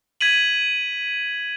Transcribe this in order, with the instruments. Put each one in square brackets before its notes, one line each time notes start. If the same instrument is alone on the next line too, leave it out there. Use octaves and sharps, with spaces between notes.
[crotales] G#6 B6 D#7 F#7